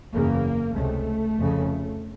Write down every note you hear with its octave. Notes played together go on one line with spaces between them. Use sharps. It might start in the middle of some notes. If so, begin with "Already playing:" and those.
F#1 E2 C#3 A#3
C#2 C3 A3
F1 F2 C#3